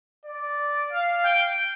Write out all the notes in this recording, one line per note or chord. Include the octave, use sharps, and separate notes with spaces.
D5
F5
G5